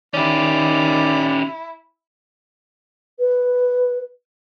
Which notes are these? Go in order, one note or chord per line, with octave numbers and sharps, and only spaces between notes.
D#3 C#4 E4 G4 D5
B4